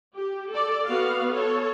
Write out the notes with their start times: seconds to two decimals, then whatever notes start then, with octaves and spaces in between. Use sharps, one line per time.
0.17 G4
0.51 A4 D5
0.86 B3 F#4 F5
1.30 A4 C#5